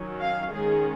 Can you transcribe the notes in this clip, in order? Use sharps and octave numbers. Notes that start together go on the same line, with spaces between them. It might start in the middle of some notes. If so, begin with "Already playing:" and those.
Already playing: D#3 F#3 C#4
F5
D#3 G#3 C#4 G#4